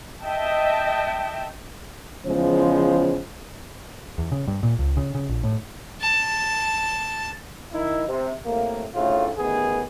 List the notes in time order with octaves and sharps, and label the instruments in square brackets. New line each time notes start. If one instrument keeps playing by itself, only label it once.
[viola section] D#5 E5 G5 A5
[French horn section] E2 C#3 F3 G#3 C5
[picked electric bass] E2
C#3
G2
A#2
C#2
C#3
C#3
A#1
A2
[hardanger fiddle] A5
[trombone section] D#3 D#4 E4
C3
A2 C3 A#3
D2 A2 C#3 F4
A1 D#3 B3 G#4